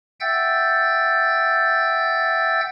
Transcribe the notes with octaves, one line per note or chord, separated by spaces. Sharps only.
E5 F#5 G5 E6 G6 A6